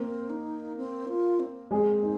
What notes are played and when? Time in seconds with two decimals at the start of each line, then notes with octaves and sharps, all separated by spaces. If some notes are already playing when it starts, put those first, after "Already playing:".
Already playing: A#3 C4 A#4
0.30 D#4
0.77 C4
1.09 F4
1.40 C4
1.71 G#3 C4 G#4
2.03 D#4